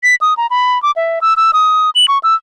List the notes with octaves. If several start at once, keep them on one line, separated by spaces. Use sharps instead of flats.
B6
D#6
A#5
B5
D6
E5
E6
E6
D#6
F#7
C#6
E6